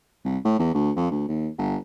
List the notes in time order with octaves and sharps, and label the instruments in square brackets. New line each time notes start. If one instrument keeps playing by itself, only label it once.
[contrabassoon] C2
A2
E2
D2
F2
D2
D#2
G1